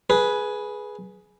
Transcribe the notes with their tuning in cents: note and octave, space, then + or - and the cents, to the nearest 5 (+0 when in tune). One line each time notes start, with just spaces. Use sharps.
G#4 +10 B4 -10